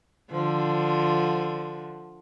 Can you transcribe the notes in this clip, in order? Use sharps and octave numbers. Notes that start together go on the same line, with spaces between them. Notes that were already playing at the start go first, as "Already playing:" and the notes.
D3 F3